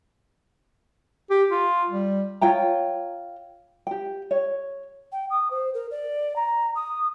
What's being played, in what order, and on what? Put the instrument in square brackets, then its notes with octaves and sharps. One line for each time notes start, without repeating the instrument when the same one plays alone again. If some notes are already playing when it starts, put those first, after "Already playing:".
[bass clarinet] G4
F4
G3
[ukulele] F4 C#5 G5 A#5
G4 G5
C#5
[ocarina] G5
D#6
C5
A#4
D5
A#5
D#6